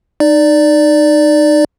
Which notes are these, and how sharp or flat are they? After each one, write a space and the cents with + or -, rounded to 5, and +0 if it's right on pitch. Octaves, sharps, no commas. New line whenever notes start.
D#4 -25 D5 +0